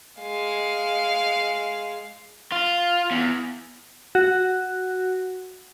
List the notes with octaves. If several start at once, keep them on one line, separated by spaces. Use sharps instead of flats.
G#3 F5
F4
E2
F#4